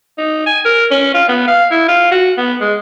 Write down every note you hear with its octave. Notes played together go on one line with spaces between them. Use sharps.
D#4
G#5
A#4
C#4
F4
B3
F5
E4
F4
F#4
B3
G#3